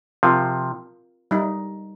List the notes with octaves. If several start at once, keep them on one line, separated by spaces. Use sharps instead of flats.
C3 F3 C4 F4 A#4 F5
G3 D#4